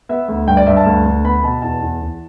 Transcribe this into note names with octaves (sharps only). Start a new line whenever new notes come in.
B3 E5
D2
G2 G5
D5
G2 E5
A5
D2
D2
B3 B5
B2 A5
E2 A5
E2
E2